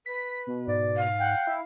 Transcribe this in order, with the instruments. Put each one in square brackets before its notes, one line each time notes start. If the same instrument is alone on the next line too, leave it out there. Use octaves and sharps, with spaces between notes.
[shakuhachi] B4 [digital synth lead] B6
[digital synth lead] B2
[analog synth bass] G#2 [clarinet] D5
[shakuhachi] F5
[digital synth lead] F#5 [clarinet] G5
[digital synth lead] E4